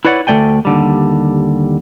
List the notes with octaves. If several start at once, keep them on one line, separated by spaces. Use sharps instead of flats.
E4 B4 C#5 D5 F#5
D2 F3 A3 D5 G5 G#5
D#2 D3 G3